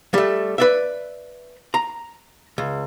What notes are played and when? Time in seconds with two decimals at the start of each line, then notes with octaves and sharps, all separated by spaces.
0.14 G3 A3
0.58 B4 D5 E5
1.74 A#5
2.58 C#2